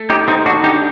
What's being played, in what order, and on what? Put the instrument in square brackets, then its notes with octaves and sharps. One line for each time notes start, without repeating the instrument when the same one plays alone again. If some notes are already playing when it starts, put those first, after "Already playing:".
Already playing: [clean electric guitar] A3
[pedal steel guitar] D#4 G4
[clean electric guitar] D#3 [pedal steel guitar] C4 D#4
[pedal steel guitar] D4 F#4
[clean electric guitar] D4 [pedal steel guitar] D#4 G4